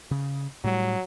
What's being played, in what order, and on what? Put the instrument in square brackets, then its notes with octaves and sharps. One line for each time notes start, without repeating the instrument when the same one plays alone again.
[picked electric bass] C#3
[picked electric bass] A2 G3 [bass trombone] F#3